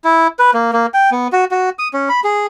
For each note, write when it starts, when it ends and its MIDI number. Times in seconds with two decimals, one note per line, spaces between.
0.04 0.27 64
0.39 0.51 71
0.54 0.71 58
0.73 0.86 58
0.94 1.10 79
1.12 1.28 59
1.32 1.45 66
1.51 1.70 66
1.79 1.88 87
1.93 2.09 61
2.09 2.20 83
2.24 2.46 68